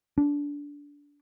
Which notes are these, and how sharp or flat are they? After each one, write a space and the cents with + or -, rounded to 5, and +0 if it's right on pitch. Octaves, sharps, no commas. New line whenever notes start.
D4 -20